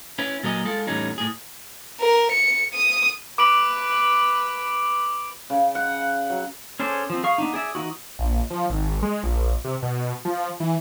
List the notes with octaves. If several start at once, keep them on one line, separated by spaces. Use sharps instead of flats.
C#4 E4 B4
A#2 F#3 A#4 D#5 G#5
G#3 F4 A4
E2 A2 G3 C#4 D#4
A2 G#4
A#4
C#7
D#6
B4 D6 D7 F#7
C#3
F#5
F#3
C#4 G#4 A4 C5 D5
F3 C4
G#4 F5 C#6
B3 D4 D#4
G#4 D5 E5
E3 D#4 E4 F#4
A#1
F3
G#1
G#3
A#1
C3
B2
F3
E3